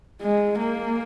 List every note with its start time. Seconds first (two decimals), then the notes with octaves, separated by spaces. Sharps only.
0.22 G#3
0.59 A#3